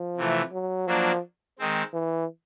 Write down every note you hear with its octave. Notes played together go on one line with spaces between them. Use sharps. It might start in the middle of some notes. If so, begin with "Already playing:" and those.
Already playing: F3
C3 E3 A3
F#3
F3 F#3 A#3 D4
D#3 G#3 C4
E3